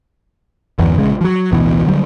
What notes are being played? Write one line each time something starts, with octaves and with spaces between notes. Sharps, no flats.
G1 E2
A#1 C#3 G#3
F3 F#3
A1 D2 B2 E3
D3 F#3 G3